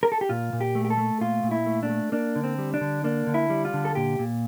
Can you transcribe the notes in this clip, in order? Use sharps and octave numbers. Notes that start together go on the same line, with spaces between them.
A#4
A4
G4
A#2 F4
A#2
G4
A3
G4
A4
A3
A#2 F4
A#2
E4
A3
D4
A3
A#3 D4
D3
C4
G3
D4
D3
A#3 D4
D3
E4
G3
F4
D3
A4
A#2 G4
A#2